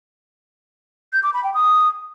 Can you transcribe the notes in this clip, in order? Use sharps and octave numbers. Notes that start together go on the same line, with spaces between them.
G6
D6
B5
G5
D#6